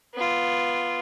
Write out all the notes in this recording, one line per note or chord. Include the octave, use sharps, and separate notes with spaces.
B3 F4